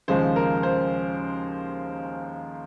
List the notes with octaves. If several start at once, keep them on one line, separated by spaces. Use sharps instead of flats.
D#2 C#3 F3 G#3 C5
A#4
C5